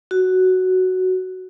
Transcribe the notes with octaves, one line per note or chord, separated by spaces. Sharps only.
F#4